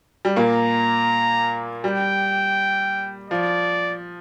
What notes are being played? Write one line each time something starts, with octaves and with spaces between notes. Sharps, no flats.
G3
A#2 A#3 A#5
G3 G5
F3 D5